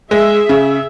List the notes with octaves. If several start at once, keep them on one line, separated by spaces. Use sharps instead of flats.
G#3 G#4 E5
C#3